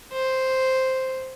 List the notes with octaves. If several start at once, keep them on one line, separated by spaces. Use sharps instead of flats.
C5